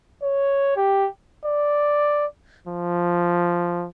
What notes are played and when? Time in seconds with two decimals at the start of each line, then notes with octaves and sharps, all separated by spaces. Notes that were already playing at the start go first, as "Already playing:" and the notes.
0.23 C#5
0.76 G4
1.45 D5
2.67 F3